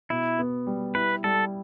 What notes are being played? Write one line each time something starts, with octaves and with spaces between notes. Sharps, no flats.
B2 E4
B3
G3
E4 B4
G3 A4